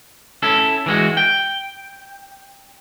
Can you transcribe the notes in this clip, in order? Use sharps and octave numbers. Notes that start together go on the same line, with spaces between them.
C#4 E4 A4
E3 G#3 F#4
G5